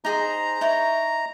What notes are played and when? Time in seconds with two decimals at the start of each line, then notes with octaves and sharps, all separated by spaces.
0.05 D#4 G#4 C5 A#5
0.61 D#4 E4 C#5